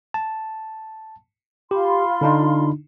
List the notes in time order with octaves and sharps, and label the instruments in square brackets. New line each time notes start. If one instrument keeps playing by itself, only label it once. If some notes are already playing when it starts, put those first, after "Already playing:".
[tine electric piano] A5
[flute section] F4 B5 C6 [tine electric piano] G4
[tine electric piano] D3 D4 D#4